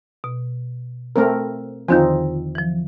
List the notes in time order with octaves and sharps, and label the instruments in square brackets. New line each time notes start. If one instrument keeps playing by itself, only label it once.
[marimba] B2
[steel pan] A3 C4 A#4
[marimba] E2 D3 D#3 [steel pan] F3 C4 D#4
[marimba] E3 F3